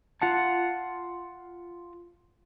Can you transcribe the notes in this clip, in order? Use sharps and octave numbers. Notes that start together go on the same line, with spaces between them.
F4 F#5 A5